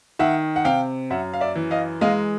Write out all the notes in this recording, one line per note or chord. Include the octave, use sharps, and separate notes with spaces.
D#3 E5 F#5
F#5
C3 F5 G5
F#2 E5 F#5
F5
D5 E5
E3
D#5 F5
G#3 D#5 F5